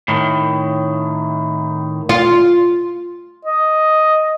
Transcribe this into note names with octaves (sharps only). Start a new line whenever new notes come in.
A2 D#3
F4
D#5